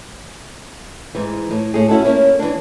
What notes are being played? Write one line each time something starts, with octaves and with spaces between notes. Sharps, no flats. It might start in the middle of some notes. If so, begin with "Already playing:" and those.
G#2 E3
A2
A2 G#4
C#4 E4 F#4 A4
A#3 C#4 E4 C#5
E3 D4